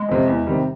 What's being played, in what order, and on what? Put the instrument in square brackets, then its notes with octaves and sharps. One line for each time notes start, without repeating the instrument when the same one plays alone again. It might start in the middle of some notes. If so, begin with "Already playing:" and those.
Already playing: [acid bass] G#3
[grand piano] F2 C3
E2
C3 D#3 G3